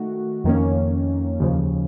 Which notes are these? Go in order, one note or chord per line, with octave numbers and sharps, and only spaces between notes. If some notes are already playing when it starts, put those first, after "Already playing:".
Already playing: D#3 A3 F#4
F2 D#3 A#3 C#4
D#2 C#3 F3